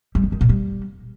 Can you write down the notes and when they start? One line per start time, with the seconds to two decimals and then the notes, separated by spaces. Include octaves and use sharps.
0.15 G3
0.24 C#3
0.32 D#3
0.41 A#2
0.49 G3